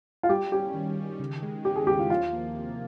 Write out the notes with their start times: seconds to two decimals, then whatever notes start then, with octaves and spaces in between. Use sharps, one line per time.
0.23 F4
0.29 G3 G4
0.52 C#4 G4
0.74 D#3
0.97 D#3
1.20 C#3
1.42 G#3
1.65 C#4 G4
1.76 G#4
1.87 D#2 G4
1.99 F4
2.10 F3 F4
2.32 A#3
2.55 C3